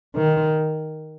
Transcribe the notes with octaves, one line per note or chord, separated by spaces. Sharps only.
D#3